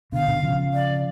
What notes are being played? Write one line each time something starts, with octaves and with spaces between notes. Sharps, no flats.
B2 D3 F5
B2 D3
C#3 F3
D5